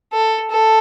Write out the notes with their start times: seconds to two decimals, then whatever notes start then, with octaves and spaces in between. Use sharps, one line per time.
0.13 A4
0.51 A4